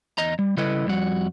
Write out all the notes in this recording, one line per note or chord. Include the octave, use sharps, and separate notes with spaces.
E2 D#5 A#5
G3
C#3 G3 E4 A4 B4 D#5
F2 G3 F#4